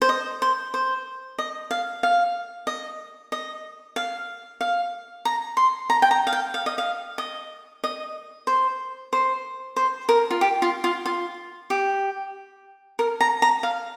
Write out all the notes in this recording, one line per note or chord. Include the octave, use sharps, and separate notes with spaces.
C5
D#5
C5
C5
D#5
F5
F5
D#5
D#5
F5
F5
A#5
C6
A#5
G5
A#5
F5
G5
F5
D#5
F5
D#5
D#5
C5
C5
C5
A#4
F4
G4
F4
F4
F4
G4
A#4
A#5
A#5
F5